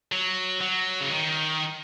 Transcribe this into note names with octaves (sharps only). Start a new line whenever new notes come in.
F#3
F#3
C#3
D#3